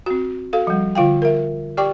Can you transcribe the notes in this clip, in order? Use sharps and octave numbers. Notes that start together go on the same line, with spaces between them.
C4 F#4
F#4 A4 F5
F3 G3
D3 F4 F5 G5
A#4 E5
G4 D5 G5 C#6 D6